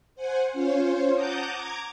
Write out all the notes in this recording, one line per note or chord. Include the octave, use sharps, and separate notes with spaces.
C5 F#5 G#5
C#4 F4 C5 C#5
F#5 A5 A#5 D6 D#6 G6
A#5 D6 G#6